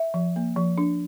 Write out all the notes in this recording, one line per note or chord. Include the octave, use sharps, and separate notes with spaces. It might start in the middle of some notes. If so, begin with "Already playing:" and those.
Already playing: E5
F3
A#3
F3
D4